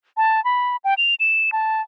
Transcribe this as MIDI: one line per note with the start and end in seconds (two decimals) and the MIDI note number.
0.17 0.43 81
0.45 0.76 83
0.84 0.94 79
0.98 1.15 101
1.20 1.50 100
1.52 1.81 81